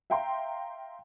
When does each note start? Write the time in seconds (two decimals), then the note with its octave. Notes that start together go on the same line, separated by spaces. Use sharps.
0.10 E5 F5 G5 A#5 C6